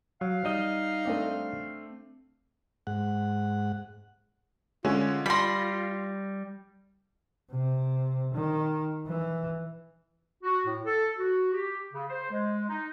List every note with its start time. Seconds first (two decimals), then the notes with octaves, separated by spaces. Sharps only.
0.21 F#3 F5
0.45 G3 D#4 D#5
1.05 A3 C4 D4
2.87 G#2 F#5
4.85 D3 G#3 C#4 F4
5.26 G3 B5 C6 A#6 B6
7.51 C3
8.34 D#3
9.08 E3
10.43 F#4
10.66 A2
10.85 A4
11.18 F#4
11.53 G4
11.93 C#3
12.09 C5
12.31 G#3
12.68 D#4